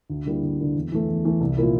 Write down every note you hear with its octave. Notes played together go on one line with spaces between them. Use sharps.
D2
D3 G3 A#3 E4
D2
D3 G3 A#3 E4
E2
E3 A3
E2
E3 A3
C2
A#2 F3 A#3 E4